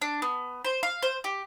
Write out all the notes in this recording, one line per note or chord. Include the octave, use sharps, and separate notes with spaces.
D4
B3
C5
F5
C5
G4